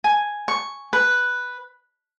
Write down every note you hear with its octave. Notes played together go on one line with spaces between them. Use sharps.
G#5
C#6
B4